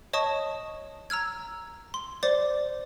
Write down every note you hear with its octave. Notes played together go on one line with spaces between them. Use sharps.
C#5 D#5 A5 C#6 D#6
A#5 E6 F6 G#6
C6
C5 D5 D6 A6